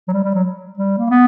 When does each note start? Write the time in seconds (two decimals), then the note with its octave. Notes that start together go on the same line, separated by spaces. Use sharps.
0.08 F#3
0.13 G3
0.24 G3
0.35 F#3
0.77 G3
0.98 A#3
1.10 B3